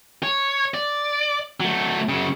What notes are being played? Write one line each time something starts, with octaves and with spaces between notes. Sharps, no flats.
C#5
D5
F#3 A3
F#2 C#3